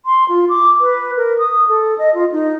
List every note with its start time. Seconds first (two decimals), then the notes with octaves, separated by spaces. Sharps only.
0.06 C6
0.29 F4
0.49 D6
0.81 B4
1.17 A#4
1.39 D#6
1.68 A4
1.98 D#5
2.14 F4
2.32 D#4